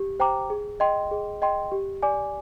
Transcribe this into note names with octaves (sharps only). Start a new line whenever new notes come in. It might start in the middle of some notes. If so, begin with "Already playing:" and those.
Already playing: G4
C5 G5 A#5 D6
G#4
D#5 G5 C6
G#4
D#5 G5 C6
G4
D5 G#5 D6